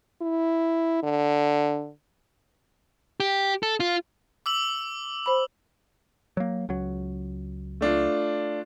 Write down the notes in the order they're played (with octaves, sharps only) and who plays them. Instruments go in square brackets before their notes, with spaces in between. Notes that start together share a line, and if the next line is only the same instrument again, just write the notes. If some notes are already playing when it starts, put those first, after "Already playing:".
[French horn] E4
D3
[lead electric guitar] G4
A4
F4
[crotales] D6 E6 F#7
[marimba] C5 B5
[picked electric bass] F#3 A#3
C#2 F#3
[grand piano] A3 D4 F4